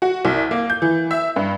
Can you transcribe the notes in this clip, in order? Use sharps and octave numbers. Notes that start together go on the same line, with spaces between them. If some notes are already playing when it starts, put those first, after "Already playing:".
F#4
C2
A#3
G6
E3
E5
G2